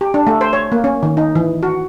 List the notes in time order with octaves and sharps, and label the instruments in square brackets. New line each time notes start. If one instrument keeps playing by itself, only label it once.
[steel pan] G4
D4
A3
C5
C#5
A#3
C#4
D#3
D#4
E3
F#4